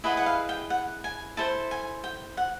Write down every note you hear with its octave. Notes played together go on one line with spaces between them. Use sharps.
E4 G#4 B4 D#5 F#5
F#5
F5
G5
F#5
G#5
E4 A4 C5 A5
G#5
G5
F#5